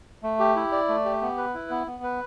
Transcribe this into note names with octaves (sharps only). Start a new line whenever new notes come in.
A3
G4
E4
D5
A3
G4
B3
B4
E4
B3
B3
B4